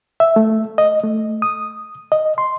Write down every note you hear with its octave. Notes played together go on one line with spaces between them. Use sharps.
E5
A3
D#5
A3
D#6
D#5
C6